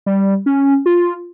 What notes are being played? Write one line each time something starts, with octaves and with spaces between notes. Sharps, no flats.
G3
C#4
F4